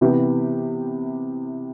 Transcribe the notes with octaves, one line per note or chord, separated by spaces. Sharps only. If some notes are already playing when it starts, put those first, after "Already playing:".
C3 E3 B3 E4 G4